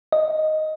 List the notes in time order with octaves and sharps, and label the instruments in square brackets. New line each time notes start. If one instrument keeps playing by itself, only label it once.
[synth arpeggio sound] D#5